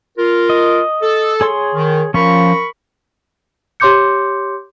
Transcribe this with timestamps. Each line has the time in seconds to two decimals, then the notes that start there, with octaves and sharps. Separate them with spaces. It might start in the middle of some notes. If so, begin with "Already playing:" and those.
0.18 F4 A#4
0.50 D#5
1.02 A4
1.41 G#4 C#5 C6
1.73 D#3
2.14 F3 C#4 F4 A#4 B5 C#6
3.80 G4 C#5 C6 D6 G6 C#7